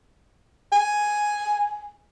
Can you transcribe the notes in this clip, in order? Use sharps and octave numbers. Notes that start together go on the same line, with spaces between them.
G#5